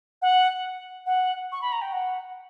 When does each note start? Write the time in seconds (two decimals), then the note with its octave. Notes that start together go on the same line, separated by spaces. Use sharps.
0.22 F#5
1.06 F#5
1.52 C#6
1.62 B5
1.72 A#5
1.82 G5
1.93 F#5